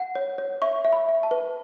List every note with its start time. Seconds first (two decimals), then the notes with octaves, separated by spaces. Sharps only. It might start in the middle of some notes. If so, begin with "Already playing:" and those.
Already playing: F#5
0.15 C#5
0.38 C#5
0.62 E5 C#6
0.85 E5
0.93 B5
1.09 E5
1.23 A5
1.31 B4